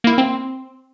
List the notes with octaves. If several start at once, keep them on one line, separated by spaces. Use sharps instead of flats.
A#3 E4
C4